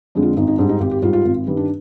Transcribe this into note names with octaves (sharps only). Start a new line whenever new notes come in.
F2 D3 G#3
F4
G#1 D#4
D#4
G#2 G3 D4
D#4
G#1 G4
G4
G#2 G3 F4
F4
G#1
G2 D#3 G3
D4